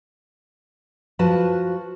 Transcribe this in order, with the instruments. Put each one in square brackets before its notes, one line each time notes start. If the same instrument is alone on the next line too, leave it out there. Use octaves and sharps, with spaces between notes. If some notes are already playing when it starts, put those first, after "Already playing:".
[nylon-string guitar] F3 F#4 B4 A5